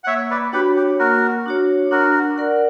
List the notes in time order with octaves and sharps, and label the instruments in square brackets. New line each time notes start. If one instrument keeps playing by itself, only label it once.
[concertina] F#5
[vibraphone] A#3 [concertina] C#5 E5
[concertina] B4 D5
[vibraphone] D4 F#4 C#5 [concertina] G4 B4
[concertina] G4
[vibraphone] A#3 [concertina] F#4 A#4
[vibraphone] D4 F#4 C#5
[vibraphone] D4 [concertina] F#4 A#4
[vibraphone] A#4 D5 F#5